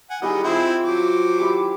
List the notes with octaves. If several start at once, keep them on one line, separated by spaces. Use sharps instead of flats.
F#5 G#5
D#3 G3 E4 G4 G#4 D#5
C4 E4 F4 G4 C5
F#3 C5 D6
E4 G4